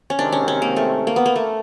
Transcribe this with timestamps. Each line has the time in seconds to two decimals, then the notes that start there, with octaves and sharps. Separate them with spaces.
0.10 C#4
0.19 C3 D#3 G#3 C4 D4
0.32 C#4
0.48 C#4
0.62 A#3
0.76 A3
1.07 A#3
1.16 B3
1.26 A#3
1.36 A3